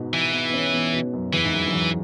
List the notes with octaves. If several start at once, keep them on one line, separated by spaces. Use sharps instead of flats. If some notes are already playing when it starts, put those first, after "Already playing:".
Already playing: G#2 B2
E3
B3
B3
C#4
B3
B2
F#2
E2 E3
G#2
F#2
F#2
E2